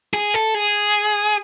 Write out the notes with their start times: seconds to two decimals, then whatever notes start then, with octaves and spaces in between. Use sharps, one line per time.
0.14 G#4
0.34 A4
0.54 G#4